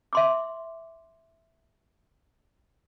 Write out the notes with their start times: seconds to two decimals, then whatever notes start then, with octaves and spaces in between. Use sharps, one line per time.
0.13 E5 C6 D6